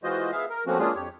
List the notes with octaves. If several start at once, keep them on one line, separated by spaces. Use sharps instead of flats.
E3 G#3 F4 F#4 C5 D#5
B3 G#4 E5 F5
A#4
F3 A3 A#3 C4 C#4 F#4
G#3 A#3 C#4 D4 F4 G#4
F2 G4 C#5